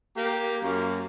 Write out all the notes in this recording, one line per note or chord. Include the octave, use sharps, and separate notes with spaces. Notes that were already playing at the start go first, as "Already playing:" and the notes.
A#3 G4
F#2 A#3